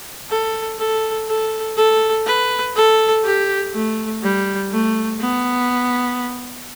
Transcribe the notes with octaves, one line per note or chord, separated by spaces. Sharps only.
A4
A4
A4
A4
B4
A4
G4
A3
G3
A3
B3